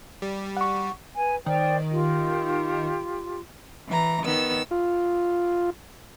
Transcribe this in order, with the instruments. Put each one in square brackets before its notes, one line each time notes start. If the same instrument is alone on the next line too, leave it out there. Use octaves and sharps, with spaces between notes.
[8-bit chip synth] G3
[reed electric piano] F#5 C#6
[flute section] B4 G#5
[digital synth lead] D#3 [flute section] C5 D5 G5
[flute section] F4 G4
[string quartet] E3 A#5
D#3 B3 E6
[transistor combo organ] F4